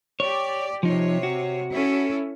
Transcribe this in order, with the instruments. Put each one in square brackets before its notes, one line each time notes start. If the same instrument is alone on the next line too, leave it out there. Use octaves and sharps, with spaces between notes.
[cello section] G4 D5 [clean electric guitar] C#5
[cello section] C3 C#5 [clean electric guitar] F3 D#4
[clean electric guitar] F#4
[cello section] C#4 E4 A4